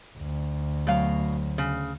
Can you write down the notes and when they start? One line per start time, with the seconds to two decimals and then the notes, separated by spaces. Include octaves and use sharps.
0.18 D2
0.87 B2 F#3 A3 F5
1.58 C#3